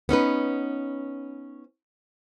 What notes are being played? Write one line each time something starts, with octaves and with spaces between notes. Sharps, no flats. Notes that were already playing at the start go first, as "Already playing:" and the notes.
B3 C#4 D#4 B4